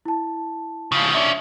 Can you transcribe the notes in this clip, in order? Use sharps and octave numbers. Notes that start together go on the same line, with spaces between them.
E4 A5
C#3 F3
C#4 D4 E5